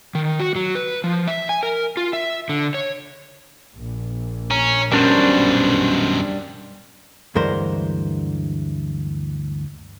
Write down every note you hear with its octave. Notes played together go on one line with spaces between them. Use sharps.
D#3
F#4
F#3
B4
F3
E5
G#5
A#4
F4
E5
D3
C#5
A#1
C#4 A#5
F#2 B2 G3 C#4 D4 A#4 C5
D2 G2 E3 G#3 A#4 C5